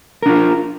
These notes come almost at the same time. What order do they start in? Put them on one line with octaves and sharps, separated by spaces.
A#4 D4 F4